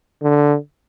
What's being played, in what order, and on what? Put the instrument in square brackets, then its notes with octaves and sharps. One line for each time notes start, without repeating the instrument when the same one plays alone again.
[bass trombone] D3